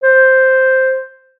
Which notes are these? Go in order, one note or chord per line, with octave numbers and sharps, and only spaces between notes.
C5